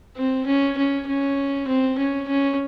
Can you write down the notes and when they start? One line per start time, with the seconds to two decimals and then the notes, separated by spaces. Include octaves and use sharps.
0.17 C4
0.46 C#4
0.77 C#4
1.07 C#4
1.67 C4
1.98 C#4
2.28 C#4